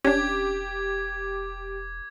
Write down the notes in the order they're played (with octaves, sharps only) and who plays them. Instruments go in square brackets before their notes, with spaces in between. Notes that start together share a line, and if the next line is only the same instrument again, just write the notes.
[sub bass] E1 [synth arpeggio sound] C#4 D4 [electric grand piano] G4 [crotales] D6 G#6